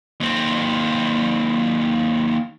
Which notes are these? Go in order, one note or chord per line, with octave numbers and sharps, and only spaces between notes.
D#2 C4